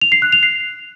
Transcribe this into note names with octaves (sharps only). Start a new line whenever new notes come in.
F7
C7
F#6
F7
C7